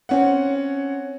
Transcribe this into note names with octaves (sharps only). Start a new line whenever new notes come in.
C4 C#4 F#5